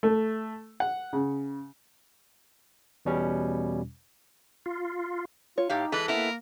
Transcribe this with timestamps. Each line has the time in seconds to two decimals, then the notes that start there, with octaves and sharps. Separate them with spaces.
0.03 A3
0.80 F#5
1.13 C#3
3.05 E2 B2 G3 C#4
4.66 F4
5.58 F4 C#5
5.69 A2 D#4 G4 F5
5.92 E3 G#3 A4 B4
6.08 A#3 B3 E4 A#4